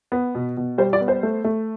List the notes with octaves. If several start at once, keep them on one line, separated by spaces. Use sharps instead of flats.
B3
B2
B2
G3 C5
D5
B3
C5
A3
A3